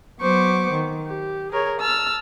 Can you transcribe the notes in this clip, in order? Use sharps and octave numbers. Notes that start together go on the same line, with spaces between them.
F#3 B3 C5 C#6 D6
D#3
G4
G#4 A#4 C#5
A5 E6 F6